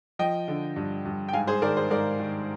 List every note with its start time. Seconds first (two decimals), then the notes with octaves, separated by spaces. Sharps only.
0.19 F3 D#5 G5
0.48 D3
0.76 G2
1.05 G2
1.29 G5
1.33 G#2 F5 G#5
1.47 G#4 C5
1.62 D#3 A#4 D5
1.77 G#4 C5
1.91 G#2 A#4 D5
2.20 D#3